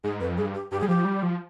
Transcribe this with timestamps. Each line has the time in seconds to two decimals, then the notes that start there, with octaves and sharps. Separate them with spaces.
0.04 G#2 G#4
0.20 F2 B4
0.37 G2 G#4
0.54 G4
0.71 G2 G4
0.80 G3 G#4
0.88 F3 G4
1.05 G3
1.23 F3